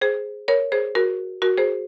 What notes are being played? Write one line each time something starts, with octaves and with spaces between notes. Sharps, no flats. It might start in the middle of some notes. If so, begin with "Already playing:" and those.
G#4 C5
A#4 C#5
G#4 C5
F#4 A#4
F#4 A#4
G#4 C5